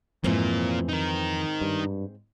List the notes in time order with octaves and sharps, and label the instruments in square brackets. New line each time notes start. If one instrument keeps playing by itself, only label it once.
[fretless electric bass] F2 E3 [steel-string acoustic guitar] G#2 C4 [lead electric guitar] A#3 F4
[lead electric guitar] D#4 A#4
[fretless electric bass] G2